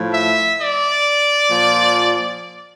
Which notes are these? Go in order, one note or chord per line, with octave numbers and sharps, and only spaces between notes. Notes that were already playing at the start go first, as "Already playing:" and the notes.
Already playing: A2 F3
E5
D5
A#2 F3